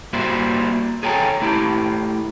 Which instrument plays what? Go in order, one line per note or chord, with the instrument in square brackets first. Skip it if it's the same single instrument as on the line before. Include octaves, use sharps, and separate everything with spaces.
[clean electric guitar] G3 A#3 E4 F#4 C5
G#4 A4 C#5 G5 G#5 A#5
A3 E4 G4